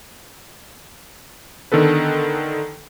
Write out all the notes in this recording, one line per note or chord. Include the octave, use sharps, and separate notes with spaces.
D3 D#3 B3 A4 B4